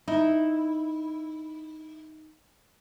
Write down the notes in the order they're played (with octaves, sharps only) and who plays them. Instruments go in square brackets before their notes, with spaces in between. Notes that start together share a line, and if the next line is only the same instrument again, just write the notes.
[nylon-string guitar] D#4 [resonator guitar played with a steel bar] E4